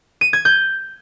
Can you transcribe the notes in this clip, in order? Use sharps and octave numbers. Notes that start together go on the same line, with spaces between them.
D#7
G#6
G6